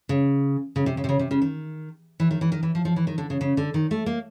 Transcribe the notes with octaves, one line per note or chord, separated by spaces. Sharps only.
C#3
C#3
C3
C#3
C3
C#3
C3
C#3
D#3
E3
D#3
E3
D#3
E3
F3
F3
E3
D#3
D3
C#3
C#3
D3
D#3
A3
A#3